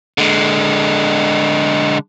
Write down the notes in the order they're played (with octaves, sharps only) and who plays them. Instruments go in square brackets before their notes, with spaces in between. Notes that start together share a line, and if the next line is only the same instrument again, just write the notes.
[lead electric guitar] D3 G#3